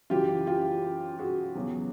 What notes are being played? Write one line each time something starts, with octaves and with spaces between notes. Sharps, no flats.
F#2 C#3 E3 F4 G4
F4 G4
F#4 G#4
E2 C#3 F#3